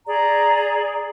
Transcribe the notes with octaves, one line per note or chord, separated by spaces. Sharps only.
G#4 D5 A#5